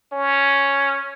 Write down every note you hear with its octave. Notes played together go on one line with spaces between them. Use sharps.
C#4